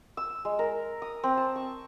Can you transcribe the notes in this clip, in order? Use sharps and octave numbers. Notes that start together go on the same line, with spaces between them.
E6
G#3
A#4
D#6
C4
A5
C#6